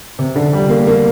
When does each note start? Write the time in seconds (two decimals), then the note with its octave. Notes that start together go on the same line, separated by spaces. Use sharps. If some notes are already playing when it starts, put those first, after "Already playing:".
0.19 C3
0.36 D3
0.53 G3
0.69 A#3
0.87 A#3